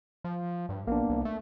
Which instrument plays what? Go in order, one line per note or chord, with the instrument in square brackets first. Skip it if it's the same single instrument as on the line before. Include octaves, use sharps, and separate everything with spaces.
[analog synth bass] F3
G2
[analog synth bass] A#1 [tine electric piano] A#3 B3 D4
[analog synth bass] C2
[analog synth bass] A3 [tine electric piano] E5